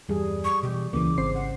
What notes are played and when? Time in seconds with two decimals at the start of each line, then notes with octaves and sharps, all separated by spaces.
0.09 E2 G2 G3 G#4
0.44 C#6
0.63 B2 E3 G4
0.93 D#1 C#2 C#3 E3 A#3 D6
1.18 G#1 C4 C5 C7
1.35 F#5